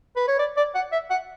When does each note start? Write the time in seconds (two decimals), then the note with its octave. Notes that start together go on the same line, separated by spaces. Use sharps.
0.16 B4
0.28 C#5
0.39 D5
0.57 D5
0.75 F#5
0.92 E5
1.10 F#5